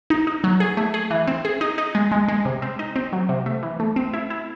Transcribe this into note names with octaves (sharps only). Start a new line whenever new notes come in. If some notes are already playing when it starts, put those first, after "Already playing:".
D#4
D#4
F#3
G#4
A3
G#4
E3
C4
G#4
D#4
D#4
G#3
G#3
G#3
C3
C4
D#4
C4
F#3
C3
A3
E3
A3
C4
E4
E4